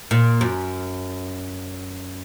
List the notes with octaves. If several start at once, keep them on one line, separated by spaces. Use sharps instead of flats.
A#2
F#2